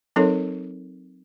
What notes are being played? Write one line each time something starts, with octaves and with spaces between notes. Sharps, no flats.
F#3 C4 D#4 A4 A#4 C#5